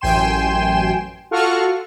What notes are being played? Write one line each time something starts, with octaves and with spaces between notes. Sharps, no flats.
A1 F#2 G5 G#5 C6 E7
F4 F#4 A4 F#5 C#6 F6